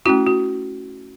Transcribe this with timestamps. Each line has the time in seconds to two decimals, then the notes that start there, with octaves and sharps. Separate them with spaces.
0.05 A3 C#4 E4 F#4
0.26 F#4